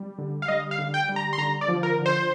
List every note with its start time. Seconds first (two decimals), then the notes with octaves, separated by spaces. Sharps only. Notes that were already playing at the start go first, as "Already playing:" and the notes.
Already playing: G3
0.18 D3
0.42 F5
0.48 G3 D#5
0.71 F5
0.78 D3
0.94 G5
1.09 G3
1.16 A#5
1.33 C6
1.38 D3 A#5
1.61 D5
1.68 F3
1.83 A#4
1.98 D3
2.06 C5